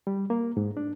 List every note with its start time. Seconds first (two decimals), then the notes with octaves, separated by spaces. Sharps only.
0.07 G3
0.30 A#3
0.57 G#2
0.77 D4